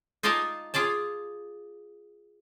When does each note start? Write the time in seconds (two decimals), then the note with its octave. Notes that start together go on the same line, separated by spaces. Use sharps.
0.23 D#4 F4 D5 D#5 G#5 A5
0.74 F4 G#4 D5 A5